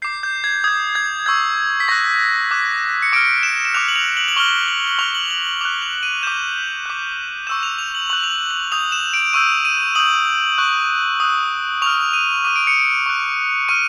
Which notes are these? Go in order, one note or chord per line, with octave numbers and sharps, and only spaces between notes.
D6 G6 C7
G6
G#6
D#6 G6 G#6
G#6
C#6 E6 G6 G#6
B6
C#6 F#6 A#6
D6 F#6
C#7
D6 F6 D7
E7
E7
D6 F#6 F7
F#7
F7
F#7
F#7
C#6 F6 G7
F#7
F#7
C#6 F6 F7
F#7
F#7
F#7
D6 F#6 F7
F7
D#7
D6 G6 E7
D6 F#6
C#6 E6 G6 E7
F7
F7
F#7
C#6 F#6 F#7
F7
F#7
F#7
D#6 G6 F7
E7
D7
C#6 E6 G6 D#7
D#7
D#6 G6 F#7
C#6 F#6
D#6 F#6
C#6 F6 F7
D#7
D6 F6 D#7
D7
C#7
D7
C#6 F#6
C#6 F6 D#7